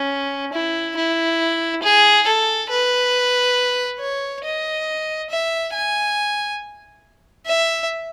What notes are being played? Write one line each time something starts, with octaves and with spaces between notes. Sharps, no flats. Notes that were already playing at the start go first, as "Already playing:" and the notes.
Already playing: C#4
E4
E4
G#4
A4
B4
C#5
D#5
E5
G#5
E5